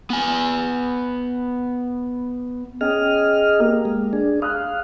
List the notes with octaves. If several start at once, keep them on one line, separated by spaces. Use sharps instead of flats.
B3 G#5
C#4 G#4 D#5 G5 F6
A#3 G4 A#4
G#3
D4 G#4
F5 D#6 F#6